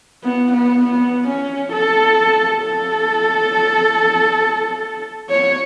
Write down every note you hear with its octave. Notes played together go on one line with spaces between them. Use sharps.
B3
B3
B3
C#4
A4
A4
C#5